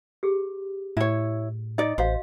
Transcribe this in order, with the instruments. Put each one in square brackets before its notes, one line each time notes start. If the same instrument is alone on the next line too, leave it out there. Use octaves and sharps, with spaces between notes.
[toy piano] G4 G#4
[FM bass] A2 [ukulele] E4 C#5
[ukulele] D#4 D5 [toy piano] D#5
[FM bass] A1 [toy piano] F#4 F5 [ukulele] C5